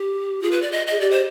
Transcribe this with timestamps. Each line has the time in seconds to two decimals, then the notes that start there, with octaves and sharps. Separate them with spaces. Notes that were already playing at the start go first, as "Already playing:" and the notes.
Already playing: G4
0.42 F4 G#4
0.51 B4
0.62 D5
0.72 D#5
0.87 G#4 D#5
1.01 G4 D5
1.11 C5